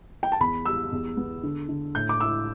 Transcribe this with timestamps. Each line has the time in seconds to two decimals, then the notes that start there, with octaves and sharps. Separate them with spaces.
0.23 G5
0.32 A5
0.40 E2 B5
0.66 G3 E6
0.92 E2
1.17 B3
1.43 D3
1.69 D3
1.95 A2 G6
2.09 D6
2.20 E4 E6